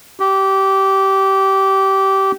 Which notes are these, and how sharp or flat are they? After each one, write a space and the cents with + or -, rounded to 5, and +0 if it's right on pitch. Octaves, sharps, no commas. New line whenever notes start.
G4 -20